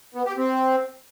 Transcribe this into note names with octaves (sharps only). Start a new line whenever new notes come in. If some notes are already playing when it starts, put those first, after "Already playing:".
B3
G4
C4